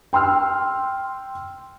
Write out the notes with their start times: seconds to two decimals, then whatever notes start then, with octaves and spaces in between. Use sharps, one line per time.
0.13 G5 C6 E6 F6